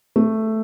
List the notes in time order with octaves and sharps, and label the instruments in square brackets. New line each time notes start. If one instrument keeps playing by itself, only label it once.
[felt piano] A3